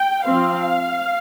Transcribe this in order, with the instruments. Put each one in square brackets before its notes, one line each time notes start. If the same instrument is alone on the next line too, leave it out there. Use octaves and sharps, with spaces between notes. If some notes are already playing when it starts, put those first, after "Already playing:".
Already playing: [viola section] G5
F3 C4 F5